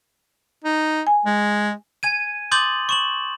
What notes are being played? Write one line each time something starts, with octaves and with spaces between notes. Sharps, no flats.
D#4
G#5
G#3
G#5 G#6 D#7
C6 D6 D#6 G6 A6 F#7
C#6 E7 F#7